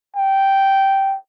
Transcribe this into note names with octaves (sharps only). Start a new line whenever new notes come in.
G5